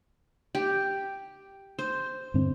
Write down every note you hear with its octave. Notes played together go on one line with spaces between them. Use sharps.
G4
C5
G2 D3 C4